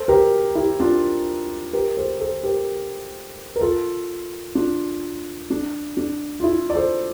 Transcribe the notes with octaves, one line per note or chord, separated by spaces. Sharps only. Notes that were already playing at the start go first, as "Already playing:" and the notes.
Already playing: A4 C5
G4 A#4
E4 G4
D4 F4
G4 A#4
A4 C5
A4 C5
G4 A#4
A#4
F4 A4
D4 F4
D4
D4
F4
E4
D5
A4 C5